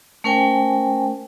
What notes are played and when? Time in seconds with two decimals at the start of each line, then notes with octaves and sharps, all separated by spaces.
0.24 A3 C#4 A#4 C5 G5 G#5